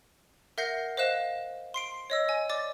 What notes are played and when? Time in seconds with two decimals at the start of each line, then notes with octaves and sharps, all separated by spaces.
0.58 A#4 E5 F#5 G6 A#6 C7
0.97 C5 D#5 F5 F#6 E7
1.74 C6 C7 D7
2.10 C#5 D#5 E6
2.28 D#5 G#5
2.49 D5 D6 A6